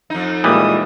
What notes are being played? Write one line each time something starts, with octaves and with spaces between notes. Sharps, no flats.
F2 D#4
A#2 E3 G3 G#3 A#3 D#6